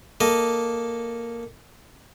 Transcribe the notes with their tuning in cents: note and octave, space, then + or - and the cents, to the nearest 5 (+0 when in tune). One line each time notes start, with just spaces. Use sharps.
A#3 +0 A4 +0 D#5 +0